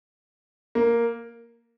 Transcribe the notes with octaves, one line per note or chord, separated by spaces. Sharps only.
A#3